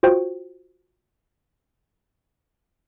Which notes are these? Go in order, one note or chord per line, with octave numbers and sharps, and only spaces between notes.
F4 F#4 C5 G5